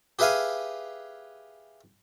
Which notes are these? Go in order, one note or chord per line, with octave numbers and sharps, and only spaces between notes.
G4 G#4 B4 E5 F5 G#5